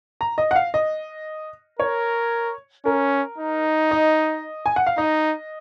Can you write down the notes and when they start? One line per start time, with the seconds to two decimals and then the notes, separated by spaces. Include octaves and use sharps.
0.21 A#5
0.38 D#5
0.51 F#5
0.56 F5
0.74 D#5
1.79 A#4 C#5
2.85 C#4 A#4
3.38 D#4
3.91 D#5
4.66 G#5
4.76 F#5
4.86 F5
4.97 D#4 D#5